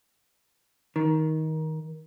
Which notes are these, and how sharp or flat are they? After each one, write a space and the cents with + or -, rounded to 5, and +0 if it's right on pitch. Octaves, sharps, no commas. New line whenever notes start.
D#3 +15